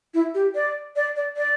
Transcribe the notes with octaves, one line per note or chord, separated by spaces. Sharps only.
E4
G4
D5
D5
D5
D5